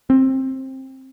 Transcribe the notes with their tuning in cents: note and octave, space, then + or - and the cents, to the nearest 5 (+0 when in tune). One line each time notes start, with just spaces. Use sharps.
C4 +20